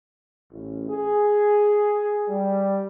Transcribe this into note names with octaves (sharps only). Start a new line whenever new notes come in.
A1
G#4
G3